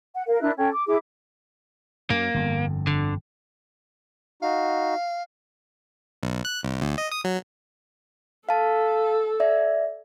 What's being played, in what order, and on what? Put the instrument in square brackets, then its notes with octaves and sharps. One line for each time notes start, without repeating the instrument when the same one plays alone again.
[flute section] F#5
A#4 F5
D4 E4 A#4 F#6
C#4 A4 G5
D6
E4 G#4 D6
[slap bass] F#2 [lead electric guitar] A#3
[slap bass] G1 F2
[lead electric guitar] D3
[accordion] D#4 F#4 [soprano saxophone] F5
[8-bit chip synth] B1
F#6
C2
D2
D#5
D#6
F#3
[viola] A4 [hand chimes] F5 A5
[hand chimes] D5 E5